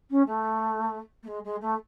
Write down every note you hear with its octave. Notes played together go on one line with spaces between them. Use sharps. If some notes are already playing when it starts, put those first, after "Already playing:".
C#4
A3
A3
G#3
G#3
A3